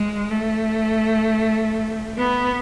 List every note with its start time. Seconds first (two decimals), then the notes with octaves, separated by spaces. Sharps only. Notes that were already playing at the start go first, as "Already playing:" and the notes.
Already playing: G#3
0.30 A3
2.18 B3